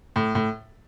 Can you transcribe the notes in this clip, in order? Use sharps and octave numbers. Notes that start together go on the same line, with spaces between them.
A2
A2